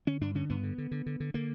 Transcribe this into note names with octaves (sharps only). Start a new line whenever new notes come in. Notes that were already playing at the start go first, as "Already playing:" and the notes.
D3 C#4
G2 D4
D3 C#4
G2 B3
D3
D3
D3
D3
D3
D3 A#3